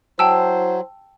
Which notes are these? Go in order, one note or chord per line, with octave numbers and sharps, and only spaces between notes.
F#3 E4 C5 G5 A5 E6